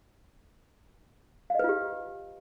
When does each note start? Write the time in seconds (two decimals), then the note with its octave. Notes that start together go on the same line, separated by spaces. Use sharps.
1.50 F5
1.55 D#5
1.59 B4
1.64 F4
1.69 G4